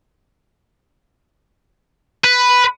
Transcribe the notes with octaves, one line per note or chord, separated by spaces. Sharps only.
B4